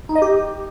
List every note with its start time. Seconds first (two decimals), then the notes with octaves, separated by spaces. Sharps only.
0.09 D#4
0.15 D#5
0.22 G4